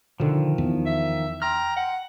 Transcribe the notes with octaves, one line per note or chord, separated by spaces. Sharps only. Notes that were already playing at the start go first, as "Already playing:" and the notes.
B2 D3 D#3 F3
E2
E5
G5 A#5 C6 F6
F#5